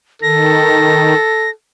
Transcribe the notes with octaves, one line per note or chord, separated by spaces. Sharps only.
D#3 A4 A#6